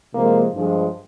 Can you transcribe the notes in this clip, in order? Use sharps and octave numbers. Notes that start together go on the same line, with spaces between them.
C3 F3 G#3 A#3
G2 F3 G#3